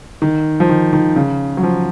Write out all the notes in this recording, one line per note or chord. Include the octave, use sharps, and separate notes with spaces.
D#3
F3
D#3
D#3
C#3
F#3
F3